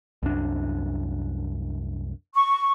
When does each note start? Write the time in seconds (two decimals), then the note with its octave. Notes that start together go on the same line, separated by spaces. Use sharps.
0.23 C2 F#2 D4
2.34 C#6